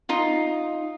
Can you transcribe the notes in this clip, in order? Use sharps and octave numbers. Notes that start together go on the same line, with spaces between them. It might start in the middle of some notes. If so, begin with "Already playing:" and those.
D#4 F4